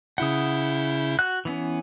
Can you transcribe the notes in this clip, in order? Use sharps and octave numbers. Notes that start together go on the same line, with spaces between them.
C#3 E4 F#5 D#6 G6
F#4 F#5 F#6
E3 B3 C#4